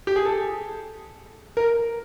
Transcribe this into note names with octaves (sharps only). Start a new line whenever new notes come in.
G4
G#4
A4
A#4